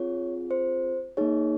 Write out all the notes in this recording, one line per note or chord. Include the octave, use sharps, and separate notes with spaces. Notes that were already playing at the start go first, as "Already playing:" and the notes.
Already playing: C4 F4 G#4 C#5
C5
A#3 D#4 G#4 C#5